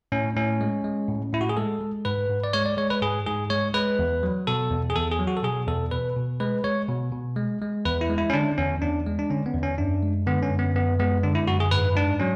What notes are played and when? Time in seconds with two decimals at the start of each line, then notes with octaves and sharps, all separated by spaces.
0.12 A2 C#4
0.37 A2 C#4
0.61 G#3
0.84 G#3
1.08 A2
1.33 A2 E4
1.41 F#4
1.49 G#4
1.57 G#3 A4
1.81 G#3
2.05 G#2 B4
2.29 G#2
2.44 D5
2.53 G#3 C#5
2.66 D5
2.77 G#3 C#5
2.90 B4
3.02 G#2 G#4
3.26 G#2 G#4
3.50 G#3 C#5
3.74 G#3 B4
3.99 E2
4.23 F#3
4.47 B2 A4
4.71 E2
4.90 G#4
4.96 E2 A4
5.12 G#4
5.19 F#3
5.27 F#4
5.37 A4
5.43 B2 G#4
5.67 E2 A4
5.91 B2 B4
6.16 B2
6.40 G#3 B4
6.64 G#3 C#5
6.88 B2
7.12 B2
7.36 G#3
7.62 G#3
7.85 E2 B4
8.01 E4
8.10 G#3
8.18 E4
8.30 C#4
8.33 D3 D4
8.58 E2 C#4
8.82 E2 D4
9.07 G#3
9.19 D4
9.30 D3 C#4
9.46 B3
9.55 E2
9.63 C#4
9.78 F#2 D4
10.02 G#3
10.26 D3 B3
10.43 C#4
10.50 F#2
10.59 B3
10.75 F#2 B3
10.99 G#3 B3
11.23 D3 D4
11.35 E4
11.47 F#2 F#4
11.60 G#4
11.71 G#2 B4
11.95 G#2 D4
12.20 F#3 C#4